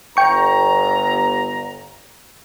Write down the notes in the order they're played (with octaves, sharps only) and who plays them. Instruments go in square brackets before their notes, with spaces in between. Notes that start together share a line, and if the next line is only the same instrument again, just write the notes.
[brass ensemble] G1 A#5 [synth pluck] G5 C#6